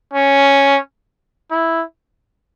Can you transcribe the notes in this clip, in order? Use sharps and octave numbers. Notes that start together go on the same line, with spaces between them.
C#4
E4